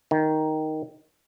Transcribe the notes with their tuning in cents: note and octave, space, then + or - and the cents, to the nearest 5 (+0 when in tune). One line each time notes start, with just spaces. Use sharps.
D#3 +5